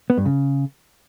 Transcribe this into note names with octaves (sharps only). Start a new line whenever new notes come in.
B3
G2
C#3